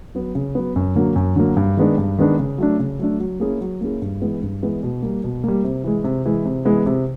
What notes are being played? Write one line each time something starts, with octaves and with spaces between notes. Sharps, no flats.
F#3 B3
C#3
F#3 B3
F#2
D3 F#3 A#3
F#2
D3 F#3 A#3
G2
D#3 G#3 B3 D4
G2
D#3 G#3 B3 D4
C#3
F#3 A3 D4
C#3
F#3 A3 D4
F#3
A#3 C#4 E4 G#4
F#3
A#3 C#4 E4 G#4
G2
E3 G#3 B3
G2
E3 G#3 B3
B2
G3 A#3
B2
G3 A#3
C3
E3 G#3
C3
E3 G#3
C3
E3 G#3 B3
C3